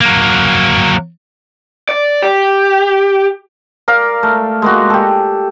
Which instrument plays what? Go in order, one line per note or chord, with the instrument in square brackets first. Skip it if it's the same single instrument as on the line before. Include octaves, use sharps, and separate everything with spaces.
[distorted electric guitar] F#3 A#3
[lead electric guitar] D5
G4
[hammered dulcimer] A#4 D5 F5
A3
G#3 A#3 F#4
G4 A4